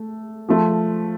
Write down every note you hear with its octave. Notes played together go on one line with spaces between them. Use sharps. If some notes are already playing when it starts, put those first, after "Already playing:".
Already playing: A3
F3 A3